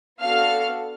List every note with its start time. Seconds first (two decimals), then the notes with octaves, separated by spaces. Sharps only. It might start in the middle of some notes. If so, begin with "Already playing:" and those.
0.20 B3 D4 F#4 A4 F5 F6